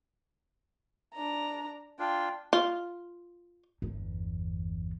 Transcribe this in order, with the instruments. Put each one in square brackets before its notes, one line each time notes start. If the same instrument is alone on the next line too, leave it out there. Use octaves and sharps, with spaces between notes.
[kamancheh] D4 A#5
[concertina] D4 F4 [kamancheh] G5
[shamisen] F4
[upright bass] G1 E2